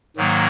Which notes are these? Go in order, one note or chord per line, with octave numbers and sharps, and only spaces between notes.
G#2 D#3 F#3 A#3